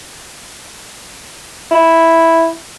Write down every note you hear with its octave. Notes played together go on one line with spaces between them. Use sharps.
E4